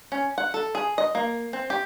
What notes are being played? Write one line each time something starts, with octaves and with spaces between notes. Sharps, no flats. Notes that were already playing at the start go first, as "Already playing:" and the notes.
C#4
F#5
A4
G#4
D#5
A#3
C4
G4